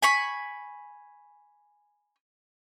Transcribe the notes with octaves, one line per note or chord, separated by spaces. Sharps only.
G#5 B5 C#6